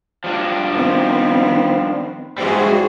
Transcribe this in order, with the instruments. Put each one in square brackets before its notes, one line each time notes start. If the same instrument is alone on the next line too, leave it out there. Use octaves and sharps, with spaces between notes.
[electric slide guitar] F3 G3 D4
[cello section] D#3 B3 C4
[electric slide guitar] G#2 E3 G3 [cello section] F#4 G#4 C5